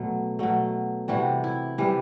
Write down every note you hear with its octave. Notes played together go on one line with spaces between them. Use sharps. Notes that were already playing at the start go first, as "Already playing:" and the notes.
Already playing: B2 F#3 A3
B2 F#3 A3
C3 E3 G3 F#4
E4
C3 E3 G3